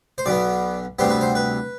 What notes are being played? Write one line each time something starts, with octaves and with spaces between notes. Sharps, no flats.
C5
B1 B2 B3 D5
D2 C3 G3 B3 C5
B4
C5
B4